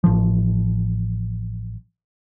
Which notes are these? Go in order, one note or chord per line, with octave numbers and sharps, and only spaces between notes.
A1 F3